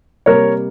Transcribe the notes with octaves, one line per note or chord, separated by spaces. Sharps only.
C3 G3 A#3 A#4 C#5